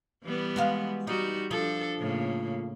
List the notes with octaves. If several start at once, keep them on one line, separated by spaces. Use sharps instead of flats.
E3 G3 B3
G#3 F#4 F5
G3 D#4 F#4
F3 D4 A4
A2 C#3 A#3